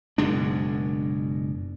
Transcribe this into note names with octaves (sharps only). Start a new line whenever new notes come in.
F#1 B2 G#3 D4